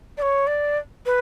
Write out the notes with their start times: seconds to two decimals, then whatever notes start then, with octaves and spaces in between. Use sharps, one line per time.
0.17 D5
0.22 C#5
0.47 D5
1.06 B4